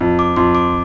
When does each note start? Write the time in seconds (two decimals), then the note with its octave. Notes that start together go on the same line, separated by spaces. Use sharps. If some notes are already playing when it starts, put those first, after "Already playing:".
0.01 F2
0.19 D6
0.36 F2 C6
0.55 D6